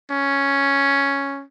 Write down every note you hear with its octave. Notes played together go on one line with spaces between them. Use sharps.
C#4